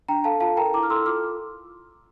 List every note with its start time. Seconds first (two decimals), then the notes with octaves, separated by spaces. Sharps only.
0.08 D4 G5 A#5
0.24 A4 F5 A5
0.40 F4 F5 A5
0.57 A#4 G5 A#5
0.73 E4 A#5 D6
0.83 F6
0.90 A4 C6 E6
1.06 F4 D6 F6